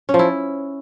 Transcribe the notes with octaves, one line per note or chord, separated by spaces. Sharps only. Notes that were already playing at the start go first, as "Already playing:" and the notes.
C#4
F3
E4